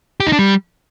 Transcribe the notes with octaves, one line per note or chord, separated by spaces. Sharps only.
G4
D#4
D4
G3